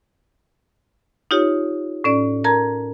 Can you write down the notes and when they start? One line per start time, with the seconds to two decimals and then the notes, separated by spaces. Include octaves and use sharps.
1.31 D#4 F4 G4 C#5
2.04 A2 C#4 D5
2.44 A#4 A5 A#5 G#6